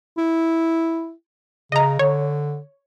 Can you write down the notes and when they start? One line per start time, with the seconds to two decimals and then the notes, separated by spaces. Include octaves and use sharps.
0.18 E4
1.72 C#3 D#5 A#5
1.99 D3 C#5